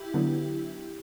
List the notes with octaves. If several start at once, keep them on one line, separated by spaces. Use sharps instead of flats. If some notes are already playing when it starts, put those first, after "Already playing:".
Already playing: E4 G4
D3 F#3 B3